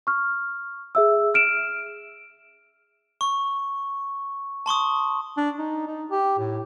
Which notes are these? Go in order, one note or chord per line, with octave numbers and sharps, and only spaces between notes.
C#6 F6
G#4 E5 E6
F6 D7 E7
C#6
A5 C6 C#6 D#6
D4
D#4
D#4
G4
A2